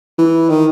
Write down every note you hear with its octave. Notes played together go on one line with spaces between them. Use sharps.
E3
D#3